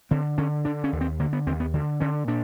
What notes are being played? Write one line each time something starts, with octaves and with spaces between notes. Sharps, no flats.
D3 C4
D3 C#4
D3 D4
C#4
D#2
C4
D3 A#3
B3
D#2 C4
B3
D3
D3 C#4
A#2 D4